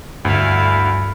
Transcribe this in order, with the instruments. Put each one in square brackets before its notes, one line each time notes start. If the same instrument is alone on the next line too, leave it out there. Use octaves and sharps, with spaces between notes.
[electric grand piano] D2 [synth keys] G2 [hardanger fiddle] E4 F5